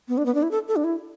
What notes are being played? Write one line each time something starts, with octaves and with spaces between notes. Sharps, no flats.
B3
D4
B3
D4
E4
A4
A4
D4
E4